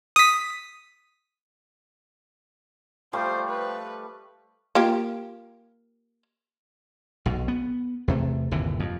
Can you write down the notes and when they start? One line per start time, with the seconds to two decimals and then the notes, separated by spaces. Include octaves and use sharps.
0.16 D#6 B6
3.13 F3 G3 A3 C5
3.50 B4
4.75 A#3 F4 G4
7.26 B1 B2
7.48 B3
8.08 E2 C3 A3
8.51 G1 D#2 C3 E3
8.80 F2